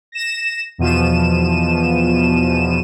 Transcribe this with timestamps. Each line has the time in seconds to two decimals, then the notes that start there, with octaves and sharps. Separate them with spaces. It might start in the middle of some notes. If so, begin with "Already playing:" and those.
0.12 A#6 E7
0.78 E2 B2 F3 D#7 E7